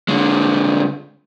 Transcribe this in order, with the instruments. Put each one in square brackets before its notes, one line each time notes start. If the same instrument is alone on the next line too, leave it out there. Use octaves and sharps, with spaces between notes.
[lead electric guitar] D3 G#3